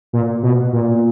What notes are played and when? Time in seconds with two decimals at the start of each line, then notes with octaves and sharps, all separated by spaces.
0.13 A#2
0.43 B2
0.73 A#2